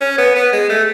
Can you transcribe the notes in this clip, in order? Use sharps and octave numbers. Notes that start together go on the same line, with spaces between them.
C#4
B3
B3
G#3
A3